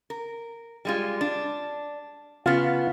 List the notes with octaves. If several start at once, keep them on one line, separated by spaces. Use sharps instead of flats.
A#4
G3 G#3 F4
D4
C#3 B3 F4